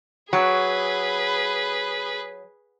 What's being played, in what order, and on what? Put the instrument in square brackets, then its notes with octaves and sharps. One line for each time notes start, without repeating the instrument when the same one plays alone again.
[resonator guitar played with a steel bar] F#3 [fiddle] G#4 B4